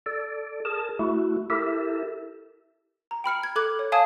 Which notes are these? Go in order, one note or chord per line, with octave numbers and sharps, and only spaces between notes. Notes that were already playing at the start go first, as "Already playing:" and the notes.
A4 D5
G#4 A#4 A5
A3 E4 F#4
E4 G4 A4 A#4 E5
A#5
G5 B5 F6 C#7
G#6
A4 D6 F#6 G#6
C#5
C#5 F5 G#5 A5 D#6 G#6